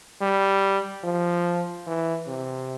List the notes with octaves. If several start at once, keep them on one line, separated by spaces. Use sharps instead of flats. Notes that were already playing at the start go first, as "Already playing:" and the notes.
G3
F3
E3
C3